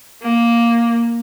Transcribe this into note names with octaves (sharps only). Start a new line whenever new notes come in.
A#3